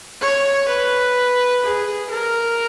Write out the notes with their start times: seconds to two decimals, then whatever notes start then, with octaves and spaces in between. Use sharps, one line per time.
0.21 C#5
0.69 B4
1.63 G#4
2.10 A#4